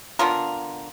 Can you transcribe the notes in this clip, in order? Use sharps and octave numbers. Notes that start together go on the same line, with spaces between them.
D3 B3 F4 A#4